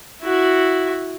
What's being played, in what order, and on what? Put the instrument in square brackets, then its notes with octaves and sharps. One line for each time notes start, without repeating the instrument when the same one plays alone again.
[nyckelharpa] E4 F#4